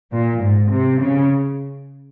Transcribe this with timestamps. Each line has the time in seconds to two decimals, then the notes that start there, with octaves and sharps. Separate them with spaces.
0.12 A#2
0.42 G#2
0.71 C3
1.01 C#3